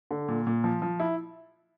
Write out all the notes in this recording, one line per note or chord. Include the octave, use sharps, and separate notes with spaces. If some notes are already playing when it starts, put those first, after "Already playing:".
D3
A#2
A#2
F3
F3
E4